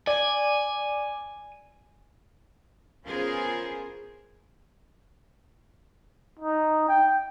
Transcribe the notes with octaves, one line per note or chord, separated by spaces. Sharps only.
D5 G#5
B3 C#4 F4 G#4 A#4 C5
D#4
G5